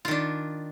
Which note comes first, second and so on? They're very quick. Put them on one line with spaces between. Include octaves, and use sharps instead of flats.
F4 D#3 D4